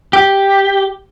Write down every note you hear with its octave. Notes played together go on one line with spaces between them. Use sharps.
G4